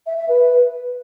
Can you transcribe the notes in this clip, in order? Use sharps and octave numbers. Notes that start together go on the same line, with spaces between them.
E5
E5
B4